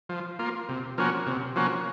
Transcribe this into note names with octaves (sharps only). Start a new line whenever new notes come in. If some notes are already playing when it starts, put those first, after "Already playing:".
F3
A#3 F4
C3
F3 A#3 C#4 F#4
C3
F3 A#3 C#4 F#4